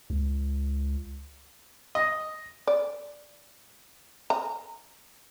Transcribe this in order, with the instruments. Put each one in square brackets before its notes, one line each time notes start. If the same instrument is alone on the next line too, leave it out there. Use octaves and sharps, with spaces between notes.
[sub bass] C#2
[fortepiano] D#5
[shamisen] D5
A#5